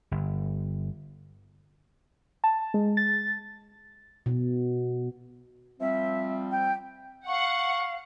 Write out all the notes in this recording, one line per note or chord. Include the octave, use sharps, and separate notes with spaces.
G1
A5
G#3
A6
B2
F3 G3 C4 E5
G5
F5 F#5 C#6